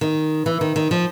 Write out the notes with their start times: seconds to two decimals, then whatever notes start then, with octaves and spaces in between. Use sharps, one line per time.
0.01 D#3
0.46 E3
0.61 D#3
0.76 D#3
0.91 F3